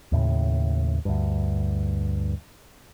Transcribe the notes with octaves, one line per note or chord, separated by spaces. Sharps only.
D#2 A2 C#3
D2 G2